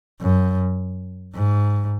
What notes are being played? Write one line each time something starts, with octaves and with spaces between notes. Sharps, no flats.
F#2
G#2